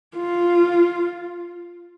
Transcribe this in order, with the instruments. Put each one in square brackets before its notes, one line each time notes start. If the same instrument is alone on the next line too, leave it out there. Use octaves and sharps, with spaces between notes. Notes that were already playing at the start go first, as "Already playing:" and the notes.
[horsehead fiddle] F4